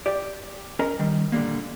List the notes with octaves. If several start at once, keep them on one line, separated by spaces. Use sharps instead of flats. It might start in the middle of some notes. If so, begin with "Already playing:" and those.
G4 D5
C#4 A#4 D#5 A#5
D#3 G3
A#2 D3 D#3 G3 A#3